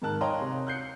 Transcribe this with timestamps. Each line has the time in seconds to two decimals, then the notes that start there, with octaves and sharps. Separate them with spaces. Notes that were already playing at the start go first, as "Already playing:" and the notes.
0.02 G#2 D#3 A#4 A5 F#6
0.21 C#5 D#5 F5 G5 A#5 C6
0.41 C3
0.67 F#6 G6 C7 C#7